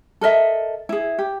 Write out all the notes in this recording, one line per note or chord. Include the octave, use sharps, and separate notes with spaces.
A4 A#4 D#5 E5
E4 G#4
G4